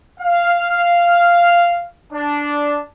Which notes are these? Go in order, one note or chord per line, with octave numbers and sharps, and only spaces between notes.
F5
D4